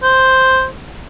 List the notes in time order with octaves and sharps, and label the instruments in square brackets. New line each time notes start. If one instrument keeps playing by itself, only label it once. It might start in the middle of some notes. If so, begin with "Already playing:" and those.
[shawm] C5